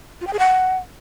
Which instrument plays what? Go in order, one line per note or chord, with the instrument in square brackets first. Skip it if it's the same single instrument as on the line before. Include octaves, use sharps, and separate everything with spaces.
[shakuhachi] F4
G5
G#4
F#5